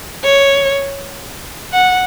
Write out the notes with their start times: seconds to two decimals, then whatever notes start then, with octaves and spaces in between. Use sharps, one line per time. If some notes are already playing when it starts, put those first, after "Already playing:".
0.24 C#5
1.73 F#5